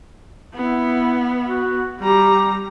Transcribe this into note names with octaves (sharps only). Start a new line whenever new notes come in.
B3 E4
F#4
G3 G4 A#5